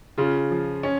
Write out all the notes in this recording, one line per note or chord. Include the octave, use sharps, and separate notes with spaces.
C#3 F4
F3
C#4